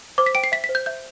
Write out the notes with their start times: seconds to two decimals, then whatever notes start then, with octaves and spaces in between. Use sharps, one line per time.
0.18 C5 D6
0.26 B6
0.35 G5 D7
0.44 C7
0.52 E5 B6
0.64 B6
0.69 C5
0.75 G6
0.86 E5 G6